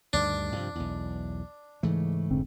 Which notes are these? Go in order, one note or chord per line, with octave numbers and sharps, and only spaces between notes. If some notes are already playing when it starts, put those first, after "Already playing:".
D2 G2 D#3 D4
G2 C3 F3
B1 E2
G#2 C#3 E3 A3
F1 D3 C4